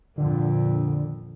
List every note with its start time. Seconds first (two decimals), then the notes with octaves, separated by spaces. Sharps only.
0.18 F2 A#2 D3